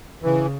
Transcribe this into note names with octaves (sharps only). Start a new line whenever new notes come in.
C#3 E3